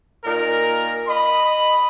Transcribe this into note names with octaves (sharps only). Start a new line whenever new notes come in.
A#2 D#4 A#4
D#5 B5